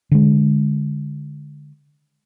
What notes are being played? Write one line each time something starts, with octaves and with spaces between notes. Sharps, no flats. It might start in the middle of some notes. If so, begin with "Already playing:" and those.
D3 G#3